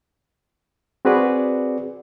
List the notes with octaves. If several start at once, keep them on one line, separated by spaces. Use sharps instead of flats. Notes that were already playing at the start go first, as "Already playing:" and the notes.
C4 F#4 G#4 B4 D5